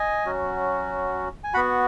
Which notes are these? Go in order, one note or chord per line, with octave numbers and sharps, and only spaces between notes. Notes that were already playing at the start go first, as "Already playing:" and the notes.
Already playing: D#5 G#5
F#3 C#4 F#4
G#5
B3 F#4 F#5 B5